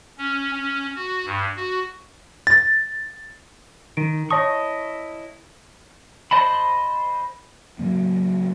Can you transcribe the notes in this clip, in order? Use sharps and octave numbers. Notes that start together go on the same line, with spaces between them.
C#4
C#4
F#4
G2
F#4
A6
D#3 D7
E4 C#5 D#5 A5 C#6 D#6
C5 D#5 A5 B5
A2 C#3 F#3 A#3